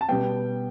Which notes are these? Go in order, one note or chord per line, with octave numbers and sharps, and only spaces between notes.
A5
B2 G3 B3 G5